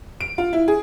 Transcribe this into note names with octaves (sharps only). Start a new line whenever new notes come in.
D7
F4
E4
G#4